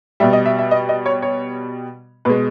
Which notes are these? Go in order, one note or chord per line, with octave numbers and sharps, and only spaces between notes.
B2 G3 E5
D#5
E5
E5
D#5
D#5
C#5
C#5
B2 G#3 B4